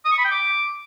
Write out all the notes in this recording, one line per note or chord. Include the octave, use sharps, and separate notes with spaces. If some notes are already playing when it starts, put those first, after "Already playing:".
D#6
C#6
B5
G5
D6